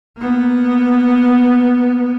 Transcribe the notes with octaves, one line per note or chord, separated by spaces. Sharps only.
A#3 B3